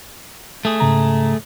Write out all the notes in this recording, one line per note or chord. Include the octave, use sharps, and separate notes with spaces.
A3 G#4
G#2 C#3 A#5